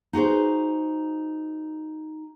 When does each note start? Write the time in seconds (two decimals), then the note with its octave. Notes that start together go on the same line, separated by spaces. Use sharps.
0.13 D#4 F#4 G#4 C5